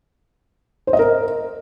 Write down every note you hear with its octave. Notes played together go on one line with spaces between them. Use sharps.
C5
D#5
A#4